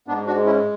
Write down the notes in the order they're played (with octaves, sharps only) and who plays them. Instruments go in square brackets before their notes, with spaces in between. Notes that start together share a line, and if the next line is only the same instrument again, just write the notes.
[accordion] G#2 B3 D4
D4 F#4
G#3
C#4 E4